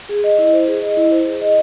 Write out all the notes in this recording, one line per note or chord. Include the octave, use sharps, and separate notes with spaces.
G#4
D#5
E4
C5
G#4
D#5
E4
C5
G#4
D#5